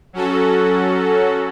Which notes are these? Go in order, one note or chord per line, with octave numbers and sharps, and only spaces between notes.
F#3 C#4 F#4 A4